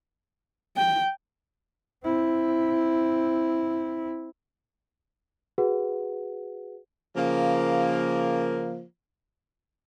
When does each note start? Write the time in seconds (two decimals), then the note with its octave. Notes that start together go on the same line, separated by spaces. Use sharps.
0.77 G5
2.04 C4 E4
5.58 F#4 G#4 B4 F#5
7.17 C#3 F3 A#3